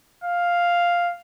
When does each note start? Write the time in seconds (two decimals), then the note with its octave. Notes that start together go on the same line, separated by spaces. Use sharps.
0.24 F5